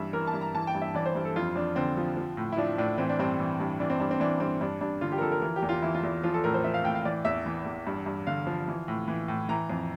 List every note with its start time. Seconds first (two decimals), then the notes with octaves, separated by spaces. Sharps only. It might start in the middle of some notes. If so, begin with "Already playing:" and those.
Already playing: G2 E3 E5
0.13 E3 A#4
0.27 A5
0.33 G2
0.41 A#5
0.54 E3 A5
0.67 G5
0.75 G2
0.82 E5
0.95 E3 D5
1.06 C5
1.15 G2
1.25 A4
1.36 F2 F4
1.56 F2 D4
1.76 D3 C4
1.97 F3
2.17 F3
2.37 A2
2.52 E4
2.57 F3 D4
2.78 A2 D4
2.98 E3 C4
3.09 D4
3.19 G2 C4
3.39 E3
3.60 G2
3.80 E3 D4
3.90 C4
4.00 G2 D4
4.11 C4
4.20 E3 D4
4.40 G2 C4
4.61 G2 D4
4.81 G2 D4
5.01 D3 F4
5.12 G4
5.18 A#4
5.21 F3 A4
5.32 A#4
5.42 E3 A#4
5.56 G4
5.62 E2
5.69 F4
5.82 E3 E4
5.95 F4
6.03 E2 E4
6.23 F3 F4
6.34 A4
6.44 A2 A#4
6.54 C5
6.64 F3 E5
6.74 F5
6.84 A2 G5
6.95 F5
7.05 E3 D5
7.25 E2 E5
7.46 E3
7.66 E2
7.87 G2
8.06 G2
8.27 D3 F5
8.47 F3
8.68 E3
8.88 A2
9.08 E3
9.28 A2
9.49 E3 A#5
9.70 F2